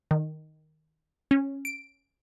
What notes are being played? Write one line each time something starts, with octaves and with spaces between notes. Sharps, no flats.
D#3
C#4
D7